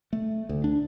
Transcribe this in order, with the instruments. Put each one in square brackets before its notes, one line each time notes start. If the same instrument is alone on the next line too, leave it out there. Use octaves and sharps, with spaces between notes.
[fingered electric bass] A3
D2
D4